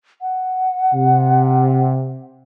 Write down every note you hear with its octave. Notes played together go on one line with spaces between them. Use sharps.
F#5
C3